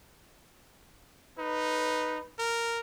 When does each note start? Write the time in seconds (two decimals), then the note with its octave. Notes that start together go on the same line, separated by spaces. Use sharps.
1.39 D#4 B4
2.39 A#4